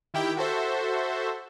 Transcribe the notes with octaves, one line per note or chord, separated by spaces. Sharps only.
D#3 E4 G4 G5
F#4 A4 C5 E5